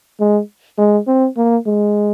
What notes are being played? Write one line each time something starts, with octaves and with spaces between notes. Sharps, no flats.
G#3
G#3
C4
A#3
G#3